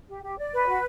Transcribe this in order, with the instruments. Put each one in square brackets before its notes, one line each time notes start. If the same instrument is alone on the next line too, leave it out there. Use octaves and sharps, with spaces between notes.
[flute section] G4
G4
D5
B4
F#4